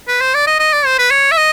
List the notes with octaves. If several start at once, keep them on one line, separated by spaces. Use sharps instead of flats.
B4
C5
D5
D#5
D#5
D5
C5
B4
C#5
E5
D#5